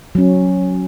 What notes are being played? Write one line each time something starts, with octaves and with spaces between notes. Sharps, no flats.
F#3 C#4